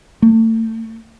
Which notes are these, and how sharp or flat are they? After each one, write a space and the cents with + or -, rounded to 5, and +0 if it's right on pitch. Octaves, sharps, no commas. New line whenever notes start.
A3 +35